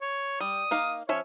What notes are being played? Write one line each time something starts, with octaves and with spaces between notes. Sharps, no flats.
C#5
G3 D#6
A#3 D#4 F5
F3 C#4 C#5 E5